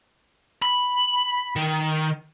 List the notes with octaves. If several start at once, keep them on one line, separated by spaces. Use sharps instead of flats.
B5
D#3